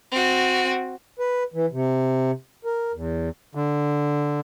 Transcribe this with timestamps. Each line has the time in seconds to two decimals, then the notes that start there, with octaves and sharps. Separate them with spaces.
0.11 C4 F#4
1.19 B4
1.54 E3
1.72 C3
2.65 A#4
2.94 E2
3.55 D3